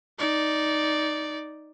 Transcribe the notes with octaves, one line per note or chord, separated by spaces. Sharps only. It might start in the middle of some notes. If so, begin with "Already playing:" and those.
D#4 D5